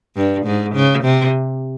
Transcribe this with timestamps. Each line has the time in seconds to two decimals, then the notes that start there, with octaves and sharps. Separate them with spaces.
0.16 G2
0.46 G#2
0.75 C#3
1.04 C3